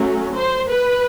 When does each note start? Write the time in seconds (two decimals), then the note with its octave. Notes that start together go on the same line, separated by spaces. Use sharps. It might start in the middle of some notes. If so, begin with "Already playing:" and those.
Already playing: F#3 A3 C#4
0.35 C5
0.70 B4